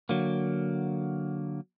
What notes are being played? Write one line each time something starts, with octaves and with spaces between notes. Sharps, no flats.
D3 F#3 A#3